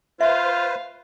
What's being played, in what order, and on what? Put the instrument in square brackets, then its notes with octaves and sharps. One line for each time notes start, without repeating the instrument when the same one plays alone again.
[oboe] F4 [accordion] B4 C5 [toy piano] E5 [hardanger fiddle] F5